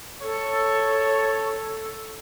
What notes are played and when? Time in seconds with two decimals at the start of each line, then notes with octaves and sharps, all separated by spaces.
0.22 A4 C#5